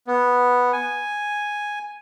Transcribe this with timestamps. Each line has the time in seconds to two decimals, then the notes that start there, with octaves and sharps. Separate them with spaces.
0.07 B3
0.73 G#5